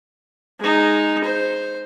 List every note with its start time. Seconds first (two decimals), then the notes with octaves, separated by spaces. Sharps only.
0.60 G#3 D#4
1.24 C5